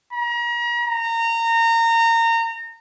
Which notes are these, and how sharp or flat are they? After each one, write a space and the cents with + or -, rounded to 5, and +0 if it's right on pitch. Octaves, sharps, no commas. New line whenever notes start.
A#5 +40
A#5 -25